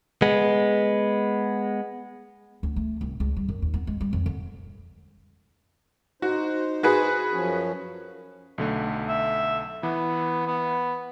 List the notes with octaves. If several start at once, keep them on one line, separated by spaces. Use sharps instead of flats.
G#3 B3
D2
A3
C2
C#2
G3
F#2
D#2
B3
G#3
G3
F2
D3
D#4 F#4 C5
F#4 G#4 B4
F#2 F3 C#4
B1 D3 A3
E5
E3 B3
B3